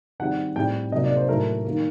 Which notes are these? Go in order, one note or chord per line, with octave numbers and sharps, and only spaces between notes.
D#3 G3 C4 F#5
A2 G3 C4 G5
C3 F#3 A#3 D#5
D5
C5
A2 F#3 A3 A#4
D#3 G3 A#3